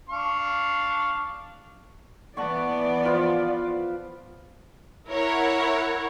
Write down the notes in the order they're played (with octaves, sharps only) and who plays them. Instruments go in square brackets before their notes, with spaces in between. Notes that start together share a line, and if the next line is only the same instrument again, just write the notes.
[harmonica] D4 F5 C#6
[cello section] E3 B3 D5 [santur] F#5 A5 C#6
[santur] F3 F4 B4
[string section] E4 A#4 C#5 F#5